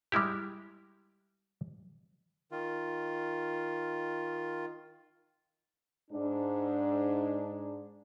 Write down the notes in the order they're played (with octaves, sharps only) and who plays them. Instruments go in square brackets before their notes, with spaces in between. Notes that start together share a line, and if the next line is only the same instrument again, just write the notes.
[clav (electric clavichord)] G3 G#3 E4 G4
[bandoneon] D#3 F4
[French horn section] G#2 D4